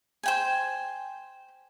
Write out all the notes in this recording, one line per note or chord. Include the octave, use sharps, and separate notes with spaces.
C5 G5 G#5